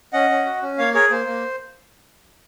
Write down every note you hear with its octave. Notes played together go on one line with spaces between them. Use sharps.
C#4 D#5 F#5
C#4
F#4
C#4
A#3 C#5 F5
G#4 A#4 C#5
A#3 C5
A#3